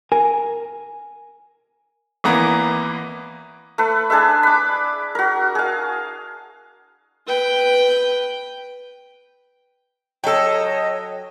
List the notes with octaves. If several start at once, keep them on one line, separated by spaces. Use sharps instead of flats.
A#4 G#5
G#1 E3 A#3 B3 A#5
A3 B4
D4 G#4 B4 E5
B5 D6
F#4 A#4
G#4 F5
B4 G5
F#3 A4 C#5 D#5 G5 E6